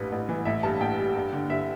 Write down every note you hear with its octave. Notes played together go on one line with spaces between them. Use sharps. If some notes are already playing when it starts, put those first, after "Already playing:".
Already playing: A1 G2 B4
A1
E3
A1 E5
G2 A5
A1 G5
G3
G2
D3
G2 E5